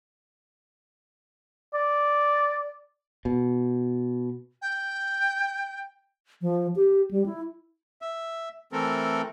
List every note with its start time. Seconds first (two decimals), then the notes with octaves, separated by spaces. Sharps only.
1.74 D5
3.25 B2
4.61 G5
6.42 F3
6.76 G4
7.11 G3
7.26 E4
8.02 E5
8.72 E3 A3 C4 A4 A#4